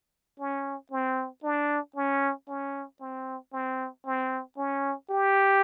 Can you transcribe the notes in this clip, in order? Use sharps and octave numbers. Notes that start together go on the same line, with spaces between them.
C#4
C4
D4
C#4
C#4
C4
C4
C4
C#4
G4